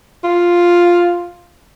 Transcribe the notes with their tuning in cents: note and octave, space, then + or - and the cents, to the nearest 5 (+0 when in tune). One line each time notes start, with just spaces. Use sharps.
F4 +0